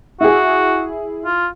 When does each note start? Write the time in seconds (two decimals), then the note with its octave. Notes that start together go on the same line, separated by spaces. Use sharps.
0.21 E4 F#4 G#4
1.25 F4